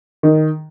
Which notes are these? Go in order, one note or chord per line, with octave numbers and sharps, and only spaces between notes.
D#3